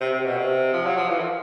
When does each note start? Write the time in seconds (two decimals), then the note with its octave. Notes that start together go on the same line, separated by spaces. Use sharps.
0.01 C3
0.13 C3
0.25 B2
0.37 C3
0.73 F3
0.86 F#3
0.97 F3
1.09 E3
1.20 F3